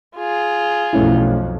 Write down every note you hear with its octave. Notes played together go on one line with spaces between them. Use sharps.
F4 G#4
B1 F2 A3 C#4 E4